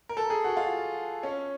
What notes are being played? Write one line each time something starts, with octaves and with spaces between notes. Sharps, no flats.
A#4
A4
G#4
F#4
F4
C#4